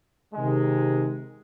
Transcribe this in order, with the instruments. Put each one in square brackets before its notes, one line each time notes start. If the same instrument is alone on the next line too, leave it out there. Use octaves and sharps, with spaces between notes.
[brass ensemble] C3 D#3 G#3